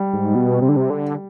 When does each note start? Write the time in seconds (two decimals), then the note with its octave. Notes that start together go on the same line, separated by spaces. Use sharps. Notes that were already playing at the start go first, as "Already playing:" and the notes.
Already playing: G3
0.14 G#2
0.35 B2
0.62 C3
0.69 D3
0.76 C3
0.90 D3